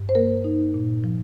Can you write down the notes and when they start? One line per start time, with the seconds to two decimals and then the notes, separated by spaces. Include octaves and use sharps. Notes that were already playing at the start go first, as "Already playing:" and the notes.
Already playing: G2
0.09 C5
0.15 A#3 A#4
0.44 D#4
0.74 A#2
1.04 F3